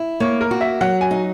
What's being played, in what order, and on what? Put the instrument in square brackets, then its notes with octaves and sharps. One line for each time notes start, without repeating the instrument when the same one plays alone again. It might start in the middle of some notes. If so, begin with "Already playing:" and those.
Already playing: [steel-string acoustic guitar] E4
[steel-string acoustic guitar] A#3 [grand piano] C#5
[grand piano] A#4
[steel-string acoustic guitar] F#4
[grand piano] E5
[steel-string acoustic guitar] F#3 [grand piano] F#5
[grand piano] G#5
[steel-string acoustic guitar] D#4